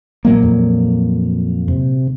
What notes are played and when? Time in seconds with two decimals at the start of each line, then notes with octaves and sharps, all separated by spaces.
0.25 A#2 F#3 A#3
0.43 F2
1.68 C3